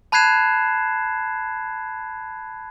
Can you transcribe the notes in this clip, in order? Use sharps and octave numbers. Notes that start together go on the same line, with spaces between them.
A5 B5 F#6 G#6 C7 E7